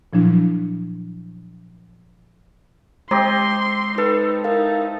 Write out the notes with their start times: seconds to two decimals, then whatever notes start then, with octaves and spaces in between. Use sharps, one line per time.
0.13 A#2 F3 F#3 D4 E4
3.11 G#3 C4 G4 D#5 C6 D6
3.98 D#4 A4 B4
4.44 D#4 E4 A#4 F5